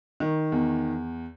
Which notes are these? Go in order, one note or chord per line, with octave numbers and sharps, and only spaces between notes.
D#3
E2